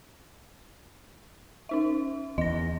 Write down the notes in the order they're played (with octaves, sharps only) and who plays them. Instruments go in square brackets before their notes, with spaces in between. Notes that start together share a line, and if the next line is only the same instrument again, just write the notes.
[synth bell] C#4 D#4 E5
[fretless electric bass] E2 [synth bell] D#5 A#6